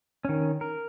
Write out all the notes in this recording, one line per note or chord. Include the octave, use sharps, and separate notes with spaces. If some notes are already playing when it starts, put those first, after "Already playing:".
D#3 C#4
A#4